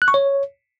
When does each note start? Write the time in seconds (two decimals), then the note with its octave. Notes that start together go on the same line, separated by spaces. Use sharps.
0.02 F#6
0.08 C#6
0.14 C#5